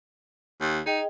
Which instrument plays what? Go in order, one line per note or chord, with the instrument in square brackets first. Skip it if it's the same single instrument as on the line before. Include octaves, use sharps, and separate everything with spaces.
[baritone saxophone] D#2
[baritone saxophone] D#4 [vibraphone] G#4 D#5 G5